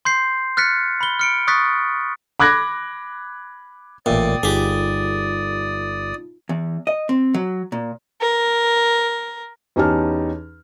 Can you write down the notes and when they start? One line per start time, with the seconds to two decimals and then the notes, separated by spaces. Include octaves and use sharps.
0.05 C6 G6 C7
0.57 F6 F#6 A6 B6 C#7
1.01 B5 G7
1.19 F6 C#7 D7
1.48 C#6 D#6 F#6 A6 B6
2.40 B5 D6 F#6 G#6 A#6
4.06 A1 A#2 D5 E5 G5 D#6
4.43 G1 D#4 F4 G4 G#4
6.49 E2
6.87 D#5
7.09 C4
7.34 F#3
7.72 A#2
8.22 A#4
9.76 E2 C#4 D#4 G4 A5 F6